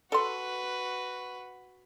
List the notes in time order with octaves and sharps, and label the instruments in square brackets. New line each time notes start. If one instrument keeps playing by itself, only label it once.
[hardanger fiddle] F#4 B4 [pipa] A4 C6